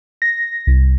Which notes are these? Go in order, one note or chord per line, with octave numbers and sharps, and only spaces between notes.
A#6
C2